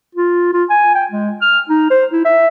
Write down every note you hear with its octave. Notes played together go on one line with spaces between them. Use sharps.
F4
F4
G#5
G5
G#3
F6
D#4
C5
E4
E5